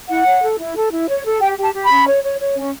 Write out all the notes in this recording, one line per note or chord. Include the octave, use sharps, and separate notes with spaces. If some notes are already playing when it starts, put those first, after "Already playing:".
E4 F#5
C#5
A4
E4
A4
E4
C#5
A4
G4 G5
G4
A5
G4
B5
C#4
C#5
C#5
C#5
C#4